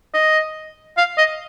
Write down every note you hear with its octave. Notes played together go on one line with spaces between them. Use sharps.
D#5
F5
D#5